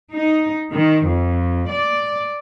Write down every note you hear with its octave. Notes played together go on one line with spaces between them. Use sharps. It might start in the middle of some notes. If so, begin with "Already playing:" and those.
D#4
D#3
F2
D5